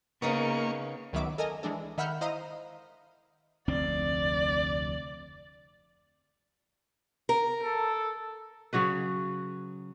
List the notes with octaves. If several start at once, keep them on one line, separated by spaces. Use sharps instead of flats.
C#3 A#3 B3 D#4 A#4 C#6
C#2 D#3 F#3 B3 E5 D6
A4 A#4 D#5 G#5
E3 G#3 D4 A4
D#3 E5 F#5 B5 F6 G6
E4 C5 D#5 F5 A#5 D#6
F1 D2 C4 D5
A#4
A4
C#3 F#3 F#4 B4